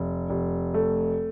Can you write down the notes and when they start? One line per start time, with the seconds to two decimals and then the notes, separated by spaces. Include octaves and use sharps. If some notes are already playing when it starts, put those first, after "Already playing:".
Already playing: F1
0.30 F1
0.74 A3